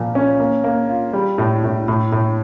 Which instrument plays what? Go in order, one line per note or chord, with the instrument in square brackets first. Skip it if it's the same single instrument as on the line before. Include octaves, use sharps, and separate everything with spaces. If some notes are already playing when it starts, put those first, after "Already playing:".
Already playing: [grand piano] A#2 F3
C#4
A#3
A#3
F4
G3
A2
A2
A2
A2